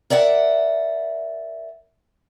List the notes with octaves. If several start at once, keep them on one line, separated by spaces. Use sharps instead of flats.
A#4 D5 E5 F#5